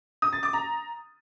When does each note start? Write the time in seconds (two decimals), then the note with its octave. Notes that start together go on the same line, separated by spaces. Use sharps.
0.22 D#6
0.33 A6
0.43 D6
0.53 A#5